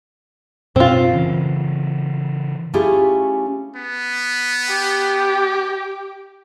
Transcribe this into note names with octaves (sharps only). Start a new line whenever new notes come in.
F#2 B2 C4 C#4 F4
C#3 E3
A3 C#4 E4 F4 G4 G#4
B3
G4